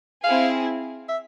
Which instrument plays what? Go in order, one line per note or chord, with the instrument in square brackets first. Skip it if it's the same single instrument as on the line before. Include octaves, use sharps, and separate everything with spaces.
[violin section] C4 E4 G#4 [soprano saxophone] F5
[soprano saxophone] E5